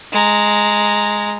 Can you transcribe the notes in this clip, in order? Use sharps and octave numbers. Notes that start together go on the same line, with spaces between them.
G#3 A#5